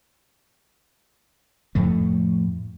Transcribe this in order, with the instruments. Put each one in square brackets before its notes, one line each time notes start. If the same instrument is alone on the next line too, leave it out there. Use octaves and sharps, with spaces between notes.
[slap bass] F2 A2 A3